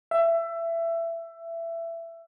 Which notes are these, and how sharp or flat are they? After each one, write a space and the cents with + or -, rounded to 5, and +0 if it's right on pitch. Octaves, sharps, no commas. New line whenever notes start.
E5 +20